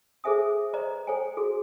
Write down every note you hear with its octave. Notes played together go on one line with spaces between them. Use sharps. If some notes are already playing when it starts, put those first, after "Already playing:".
G#4 A4 C5 E5 G#5 D#6
B4 C5 D5 D#5 A#5
A4 C5 C#5 G5 G#5
F#4 G#4 A4